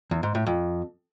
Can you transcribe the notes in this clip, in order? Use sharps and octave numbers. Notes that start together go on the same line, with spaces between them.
E2
G#2
A2
F2